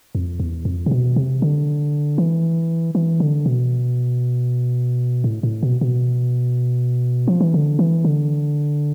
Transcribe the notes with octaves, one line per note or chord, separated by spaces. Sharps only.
F2
E2
F2
C3
B2
C3
D3
E3
E3
D3
B2
A2
A2
B2
B2
F3
E3
D3
E3
D3